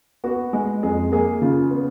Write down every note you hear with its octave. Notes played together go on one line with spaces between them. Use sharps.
B3 F#4
G#3
F2 G#4
A#3 G#4
C#3 F4
B3